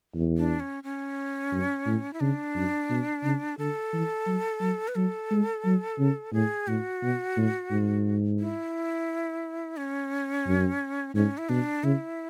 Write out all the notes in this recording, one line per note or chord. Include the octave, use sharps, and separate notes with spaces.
E2
D4
C#4
C#4
F#2
A2
E4
C#3 D4
F#2
B2
C#3
D3 A4
E3
F#3
F#3
B4
F#3 A4
G#3
F#3
C#3
A2 G#4
A2 F#4
B2
A2
G#2
E4
C#4
F#2
G#2 C#4
E4
B2 D4
C#3 E4